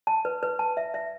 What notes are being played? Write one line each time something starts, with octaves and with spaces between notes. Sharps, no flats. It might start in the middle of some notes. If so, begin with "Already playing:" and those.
A5
B4
B4
A5
E5
E5